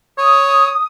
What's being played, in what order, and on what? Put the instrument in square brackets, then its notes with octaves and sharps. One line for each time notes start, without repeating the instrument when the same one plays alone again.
[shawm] C#5 [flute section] D#6